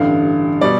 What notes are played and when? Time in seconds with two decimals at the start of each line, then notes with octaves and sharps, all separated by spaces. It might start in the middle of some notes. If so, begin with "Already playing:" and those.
Already playing: A1 G2 D3 F5
0.61 B2 G3 D5